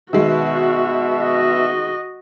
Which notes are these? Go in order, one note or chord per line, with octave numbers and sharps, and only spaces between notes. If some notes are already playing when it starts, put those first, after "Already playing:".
B2 D#3 G#3 F#4 E5
F#4 D#5